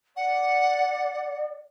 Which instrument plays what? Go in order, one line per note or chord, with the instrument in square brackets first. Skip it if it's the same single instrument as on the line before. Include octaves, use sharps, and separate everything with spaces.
[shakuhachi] D5 [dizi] F#5